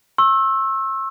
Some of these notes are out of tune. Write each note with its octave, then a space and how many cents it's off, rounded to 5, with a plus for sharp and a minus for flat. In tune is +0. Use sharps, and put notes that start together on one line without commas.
C#6 -45 E6 +0